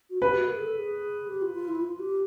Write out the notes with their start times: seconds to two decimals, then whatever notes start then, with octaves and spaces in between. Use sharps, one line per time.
0.10 F#4
0.22 G4 B4
0.35 F#4
0.48 A#4
0.57 G#4
0.61 A4
0.75 G#4
1.28 G4
1.42 F4
1.55 F4
1.68 E4
1.82 F4
2.00 G4